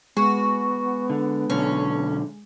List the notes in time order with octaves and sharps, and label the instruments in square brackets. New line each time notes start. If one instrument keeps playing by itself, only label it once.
[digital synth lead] G#3 [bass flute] B3 [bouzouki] F#4
[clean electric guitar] D3
[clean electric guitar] B1 D3 [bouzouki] C#4